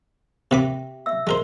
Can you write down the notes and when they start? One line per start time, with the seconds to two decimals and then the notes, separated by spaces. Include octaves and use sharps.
0.51 C3 G4 B4 E5 G5 D6
1.06 E5 E6
1.27 G#3 A#4 C5